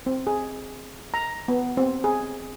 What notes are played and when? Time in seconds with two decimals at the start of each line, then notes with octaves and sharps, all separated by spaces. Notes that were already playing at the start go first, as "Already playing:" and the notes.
0.06 C4
0.27 G#4
1.14 A#5
1.48 B3
1.77 C4
2.04 G#4